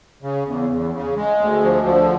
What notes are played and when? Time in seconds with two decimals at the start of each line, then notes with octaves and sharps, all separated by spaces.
0.22 C#3
0.46 E2
0.70 E2
0.93 C#3
1.17 G#3
1.40 D2
1.64 F3
1.87 D3